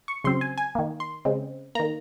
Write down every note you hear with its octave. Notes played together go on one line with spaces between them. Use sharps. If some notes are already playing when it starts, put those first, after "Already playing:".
C#6
C#3 F#3 C4 C6
G#5
G#5
D#3 A#3
C6
C#3 G#3 C4
D#3 A#3 A#5